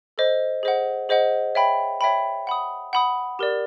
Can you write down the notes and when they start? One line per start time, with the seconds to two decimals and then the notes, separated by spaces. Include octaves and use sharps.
0.18 A4 C5 D#5
0.63 G#4 C5 D#5 F#5
1.09 G#4 C5 D#5 F#5
1.55 C#5 E5 G5 B5
2.01 C#5 E5 G5 B5
2.47 F#5 B5 D#6
2.93 F#5 B5 D#6
3.39 G4 A#4 D5